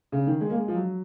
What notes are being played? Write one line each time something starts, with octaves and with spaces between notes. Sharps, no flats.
C#3
D#3
G#3
A#3
G#3
F3
F#3